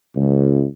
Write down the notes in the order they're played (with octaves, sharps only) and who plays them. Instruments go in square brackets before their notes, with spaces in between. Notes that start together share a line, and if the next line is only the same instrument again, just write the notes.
[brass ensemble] C#2